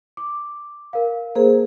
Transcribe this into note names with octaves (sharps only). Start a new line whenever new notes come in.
D6
A#4 F5
A#3 G#4 A#4 C5